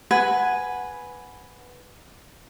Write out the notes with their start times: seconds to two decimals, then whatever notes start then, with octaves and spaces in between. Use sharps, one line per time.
0.11 B4 F#5 G#5